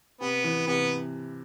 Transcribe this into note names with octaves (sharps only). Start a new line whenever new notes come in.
C3 B3
E3
C3 B3